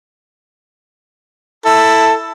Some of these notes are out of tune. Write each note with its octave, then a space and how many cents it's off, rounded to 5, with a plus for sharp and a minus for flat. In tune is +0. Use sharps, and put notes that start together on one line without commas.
E4 +0 A4 +10